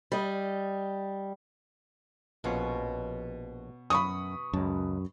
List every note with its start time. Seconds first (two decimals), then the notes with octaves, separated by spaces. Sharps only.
0.12 G3 D#5
2.44 A#1 B2 C#4 F4 C#5 F#5
3.90 F#2 B5 C#6 D#6
4.53 C#2 F#2 A5